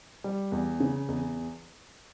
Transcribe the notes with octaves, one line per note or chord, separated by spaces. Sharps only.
G3
E2
C#3
E2